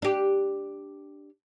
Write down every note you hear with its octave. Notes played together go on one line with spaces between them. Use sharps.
D4 G4